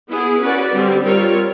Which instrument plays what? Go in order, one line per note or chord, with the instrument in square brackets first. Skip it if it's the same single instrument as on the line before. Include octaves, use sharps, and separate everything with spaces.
[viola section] B3 E4 G#4
C#4 F#4 B4 D5
D3 G3 C4
G3 C4 F4 A#4 C#5